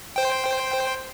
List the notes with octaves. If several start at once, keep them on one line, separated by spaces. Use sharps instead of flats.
C5 G5